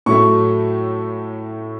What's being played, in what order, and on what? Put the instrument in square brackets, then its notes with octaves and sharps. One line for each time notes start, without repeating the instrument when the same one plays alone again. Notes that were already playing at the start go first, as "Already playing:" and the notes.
[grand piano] A2 F#3 A3 C#6